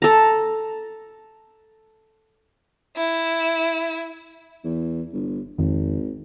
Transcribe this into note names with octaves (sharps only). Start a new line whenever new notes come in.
A4 A#5
E4
E2
G1
G#1 F2 D#3